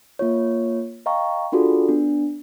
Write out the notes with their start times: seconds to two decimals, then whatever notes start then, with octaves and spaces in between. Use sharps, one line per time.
0.19 A#3 F4 C#5
1.06 D#5 F5 G5 A#5 C#6
1.52 D4 F4 F#4 G#4 A4 D5
1.89 B3 D4